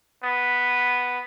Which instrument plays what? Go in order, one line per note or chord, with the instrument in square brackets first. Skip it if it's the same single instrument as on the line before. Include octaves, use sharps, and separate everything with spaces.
[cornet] B3